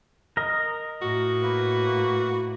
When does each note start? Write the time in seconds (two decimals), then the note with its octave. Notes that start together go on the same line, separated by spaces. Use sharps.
0.37 A#4 D#5
1.02 A2 F#4
1.42 A#3 B4